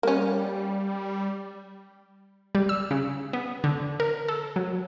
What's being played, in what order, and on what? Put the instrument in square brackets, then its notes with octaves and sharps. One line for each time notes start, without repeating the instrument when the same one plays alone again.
[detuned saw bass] G3 [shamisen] A#3 C#4
[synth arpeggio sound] G3
E6
C#3
B3
D3
A#4
A4
F#3